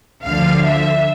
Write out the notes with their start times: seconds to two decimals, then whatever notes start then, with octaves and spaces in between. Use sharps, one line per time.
0.23 D2 D3 F3 F5
0.66 E5